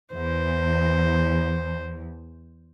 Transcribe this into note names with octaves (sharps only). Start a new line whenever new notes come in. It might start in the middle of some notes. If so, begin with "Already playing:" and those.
E2 C5